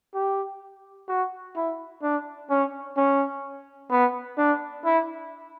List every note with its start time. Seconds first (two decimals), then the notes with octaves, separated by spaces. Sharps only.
0.15 G4
1.09 F#4
1.56 E4
2.02 D4
2.50 C#4
2.97 C#4
3.91 B3
4.38 D4
4.85 E4